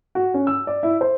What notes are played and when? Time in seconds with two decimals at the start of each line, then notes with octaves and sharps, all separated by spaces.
0.15 F#4
0.34 C#4
0.47 E6
0.67 D5
0.83 E4
1.01 C5